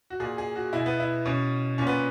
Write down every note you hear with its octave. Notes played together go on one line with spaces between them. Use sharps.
F#4
A#2 G#4
G#4
F#4
B2 E4
B3
E4
B2 C#4
A#2 C#4
B3